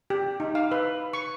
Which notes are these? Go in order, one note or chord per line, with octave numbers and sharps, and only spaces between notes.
G4
D#4
F5
B4
C#6